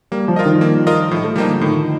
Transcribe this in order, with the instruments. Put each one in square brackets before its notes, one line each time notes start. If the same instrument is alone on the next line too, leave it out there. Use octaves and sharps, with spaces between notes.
[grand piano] G3 [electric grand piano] A#3
[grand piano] F3
[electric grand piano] F4 A#4 D#5
[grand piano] D#3
[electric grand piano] A#3
F4 A#4 D#5
[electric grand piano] A2 [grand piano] F3
[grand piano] A3
[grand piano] F3 [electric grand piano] G3 A#3 D#4
[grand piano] D3
[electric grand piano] A2 [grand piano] D#3